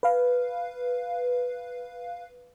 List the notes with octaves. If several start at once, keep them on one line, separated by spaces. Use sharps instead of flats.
B4 F5